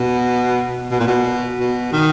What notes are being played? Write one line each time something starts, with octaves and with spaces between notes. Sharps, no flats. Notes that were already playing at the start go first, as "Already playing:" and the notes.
Already playing: B2
B2
A#2
B2
B2
D#3